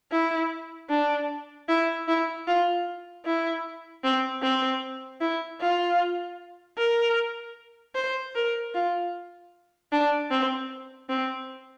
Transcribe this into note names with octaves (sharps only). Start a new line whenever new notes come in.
E4
D4
E4
E4
F4
E4
C4
C4
E4
F4
A#4
C5
A#4
F4
D4
C4
C4